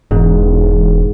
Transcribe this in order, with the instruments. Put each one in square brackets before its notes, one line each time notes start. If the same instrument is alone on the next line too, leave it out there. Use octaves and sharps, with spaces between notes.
[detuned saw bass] E1 [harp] G#2